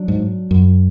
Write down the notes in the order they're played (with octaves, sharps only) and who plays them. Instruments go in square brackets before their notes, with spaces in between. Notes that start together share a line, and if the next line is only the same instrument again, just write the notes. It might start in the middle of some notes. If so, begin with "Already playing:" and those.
Already playing: [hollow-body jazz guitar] F#3 D4
[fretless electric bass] G#2
F#2